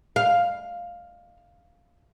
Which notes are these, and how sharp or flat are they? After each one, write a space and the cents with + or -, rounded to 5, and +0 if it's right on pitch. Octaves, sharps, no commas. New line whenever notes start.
F5 +5